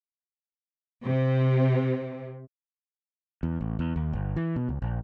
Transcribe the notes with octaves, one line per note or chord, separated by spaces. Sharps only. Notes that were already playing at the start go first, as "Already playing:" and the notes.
C3
E2
A1
E2
D#2
G1
E3
B2
C#2
A#1